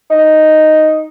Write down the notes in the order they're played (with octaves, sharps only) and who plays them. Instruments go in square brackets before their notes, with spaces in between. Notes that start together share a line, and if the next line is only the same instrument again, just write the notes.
[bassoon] D#4